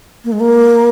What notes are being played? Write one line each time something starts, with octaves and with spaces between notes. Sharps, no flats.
A#3
G#3
A#3